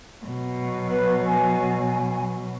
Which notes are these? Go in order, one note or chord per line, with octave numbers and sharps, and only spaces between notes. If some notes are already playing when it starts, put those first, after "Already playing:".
B2 F#3
B4
G#5